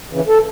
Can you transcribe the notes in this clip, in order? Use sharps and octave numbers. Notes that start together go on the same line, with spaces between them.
C#3 E3
A4